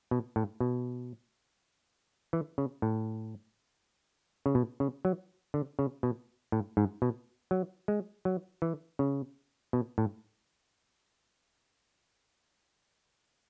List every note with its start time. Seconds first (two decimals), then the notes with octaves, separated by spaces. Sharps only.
0.11 B2
0.36 A2
0.60 B2
2.33 E3
2.58 C#3
2.82 A2
4.46 C#3
4.55 B2
4.80 C#3
5.05 F#3
5.54 D3
5.79 C#3
6.03 B2
6.52 A2
6.77 G#2
7.02 B2
7.51 F#3
7.88 G#3
8.25 F#3
8.62 E3
8.99 C#3
9.73 B2
9.98 A2